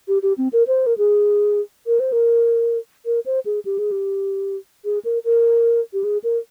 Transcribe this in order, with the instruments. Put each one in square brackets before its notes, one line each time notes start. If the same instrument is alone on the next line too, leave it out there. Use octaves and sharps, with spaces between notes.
[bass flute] G4
G4
C4
A#4
C5
A#4
G#4
A#4
C5
A#4
A#4
C5
G#4
G4
G#4
G4
G#4
A#4
A#4
G4
G#4
A#4